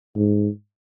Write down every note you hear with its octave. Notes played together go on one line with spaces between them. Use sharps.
G#2